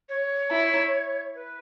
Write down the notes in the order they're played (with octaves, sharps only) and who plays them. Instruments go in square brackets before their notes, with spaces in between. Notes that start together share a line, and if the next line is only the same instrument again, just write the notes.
[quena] C#5
[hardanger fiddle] E4
[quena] B4